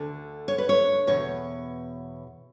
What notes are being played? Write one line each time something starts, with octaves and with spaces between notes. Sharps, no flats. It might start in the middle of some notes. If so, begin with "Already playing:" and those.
Already playing: D2 D3
C#5
B4
C#5
E2 B2 C#5